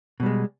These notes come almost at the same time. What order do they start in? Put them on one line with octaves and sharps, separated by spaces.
B2 G3 G#3